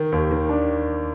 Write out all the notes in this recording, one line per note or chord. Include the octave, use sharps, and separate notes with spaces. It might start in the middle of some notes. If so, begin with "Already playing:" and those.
Already playing: D#3
D#2
D#3
D4